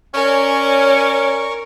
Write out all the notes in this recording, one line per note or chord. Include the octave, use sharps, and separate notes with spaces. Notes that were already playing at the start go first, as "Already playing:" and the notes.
C#4 A#4 C#5 D5 G#5 C#6